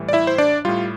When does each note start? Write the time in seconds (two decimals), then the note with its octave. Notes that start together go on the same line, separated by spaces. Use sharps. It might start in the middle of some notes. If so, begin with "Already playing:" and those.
Already playing: A2 E3 G3
0.09 D5
0.13 E4 E5
0.27 C5
0.38 D4 D5
0.65 A2 G3 F4